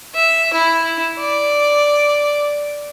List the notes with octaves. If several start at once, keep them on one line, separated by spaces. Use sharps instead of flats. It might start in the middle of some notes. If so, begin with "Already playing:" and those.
E5
E4
D5